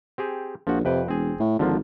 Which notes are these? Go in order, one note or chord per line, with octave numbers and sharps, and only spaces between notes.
C4 G4 G#4
A#1 F3 F#4
F2 C3 B4 G5
E1 C4 G#4
A2
G#1 D3 F3 A#3